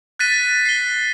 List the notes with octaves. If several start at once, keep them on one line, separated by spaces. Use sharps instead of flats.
F#6 A6 B6 D#7
C7 G7